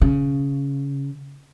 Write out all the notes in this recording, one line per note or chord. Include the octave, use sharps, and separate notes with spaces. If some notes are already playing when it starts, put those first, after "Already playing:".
C#3